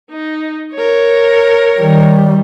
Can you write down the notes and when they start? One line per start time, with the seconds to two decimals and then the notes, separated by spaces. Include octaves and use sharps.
0.11 D#4
0.74 A#4 C#5
1.78 D#3 G3